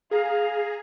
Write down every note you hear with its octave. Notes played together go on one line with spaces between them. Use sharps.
G#4 F5 A#5